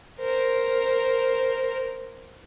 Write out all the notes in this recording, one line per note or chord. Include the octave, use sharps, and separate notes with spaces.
A#4 C5